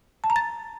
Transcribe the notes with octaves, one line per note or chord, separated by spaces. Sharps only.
A5
A#5
A6